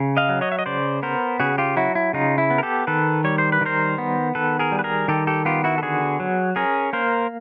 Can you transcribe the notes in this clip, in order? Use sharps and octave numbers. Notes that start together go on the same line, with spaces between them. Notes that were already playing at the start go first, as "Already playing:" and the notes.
Already playing: C#3
D#5 F5
F#3
C#5 D#5
E5
D#5
C#3 C5 D5
B3 A#4 C5
C#3 F#4 G#4
F4 G4
F#3 E4 F#4
E4
C#3 D#4 F4
E4
B3
A#4
G4 A4
D#3 A4 B4
G3 C#5
C5
B4
D#3 A#4 C5
B3
D#3 A4 B4
G#4 A#4
G3
B4
G#4 A#4
D#3 G4 A4
G4 A4
B3 F4 G4
E4 F#4
A4
D3 F#4 G#4
F#3
C#4 G#4 A#4
A#3 A#4 C5